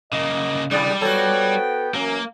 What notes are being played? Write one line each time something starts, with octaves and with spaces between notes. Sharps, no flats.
C#3 A#3 D#5
C2 C3 G3 E4 G#4 D5
B3 F#4 A4 C5 C#5 G5
F#2 E3 F#3 A#3 C#4